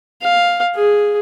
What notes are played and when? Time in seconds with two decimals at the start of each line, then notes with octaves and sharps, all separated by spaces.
0.22 F5
0.76 G#4